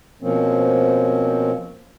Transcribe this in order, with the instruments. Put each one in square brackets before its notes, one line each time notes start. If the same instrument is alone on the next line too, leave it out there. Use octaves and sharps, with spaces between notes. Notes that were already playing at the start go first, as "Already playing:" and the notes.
[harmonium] B2 F3 A#3 C4 C#4